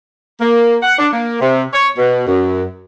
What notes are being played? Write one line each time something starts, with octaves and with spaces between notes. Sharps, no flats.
A#3
F#5
D4
A#3
C3
C#5
B2
F#2